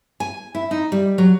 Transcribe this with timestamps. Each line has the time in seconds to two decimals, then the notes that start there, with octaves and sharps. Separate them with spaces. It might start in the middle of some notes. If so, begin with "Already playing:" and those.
0.20 G#5
0.55 E4
0.71 D#4
0.92 G3
1.18 F#3